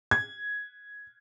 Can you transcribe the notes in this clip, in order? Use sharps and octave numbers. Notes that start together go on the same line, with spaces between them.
G#6